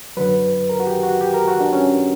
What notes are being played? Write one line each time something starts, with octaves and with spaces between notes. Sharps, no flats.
F#2 D3 F#3 B4
A#4
F#4
G4
F#4
G4
A#4
F#4
D4
C#4